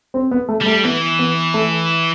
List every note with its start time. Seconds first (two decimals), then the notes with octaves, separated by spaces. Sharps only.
0.14 C4
0.31 B3
0.49 A3
0.61 G3
0.66 A3
0.84 E3 B3
1.19 B3
1.54 A3